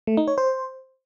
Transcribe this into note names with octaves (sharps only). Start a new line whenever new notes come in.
A3
D#4
C#5
C5